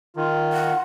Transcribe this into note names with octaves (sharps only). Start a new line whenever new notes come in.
D#3 F4
F#5